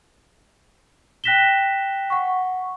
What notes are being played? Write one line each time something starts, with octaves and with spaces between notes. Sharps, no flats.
G5 F#6 A#6 B6 E7 G7
F#5 C#6